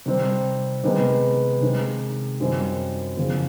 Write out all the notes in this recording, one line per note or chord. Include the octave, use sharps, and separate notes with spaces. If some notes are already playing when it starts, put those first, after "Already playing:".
C3 D#3 G3 C4
C3 D#3 G#3 B3 D#4
C3 D#3 G#3
F#2 D#3 G3 C4 F4
E2 C#3 F3